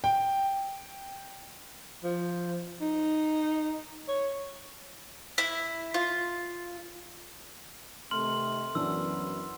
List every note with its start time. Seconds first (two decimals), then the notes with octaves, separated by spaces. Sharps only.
0.04 G5
2.04 F3
2.81 D#4
4.08 C#5
5.38 E4
5.94 F4
8.11 C3 D#3 A3 C6 F6 F#7
8.75 F#2 E3 B3 D4 E6